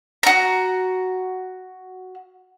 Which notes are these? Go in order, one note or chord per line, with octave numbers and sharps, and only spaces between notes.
F#4 A#5